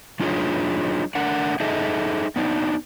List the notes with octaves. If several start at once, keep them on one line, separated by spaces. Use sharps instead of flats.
F#3 D4 D#4 F4 G#4 C#5
A3 D4 A#4 F#5
D#4 G#4 A4 D#5 E5
B3 D4 D#4